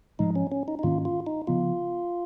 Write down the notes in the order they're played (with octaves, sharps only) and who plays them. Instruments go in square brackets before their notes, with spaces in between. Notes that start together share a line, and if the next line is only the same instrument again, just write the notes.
[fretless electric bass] G#2 F3 G#3 [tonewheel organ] D#4
[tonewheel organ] C#4
C#4
D#4
D#4
[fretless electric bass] G#2 D#3 A#3 C#4 [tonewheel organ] F4
[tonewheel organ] F4
D#4
[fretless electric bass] C#3 F3 B3 [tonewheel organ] F4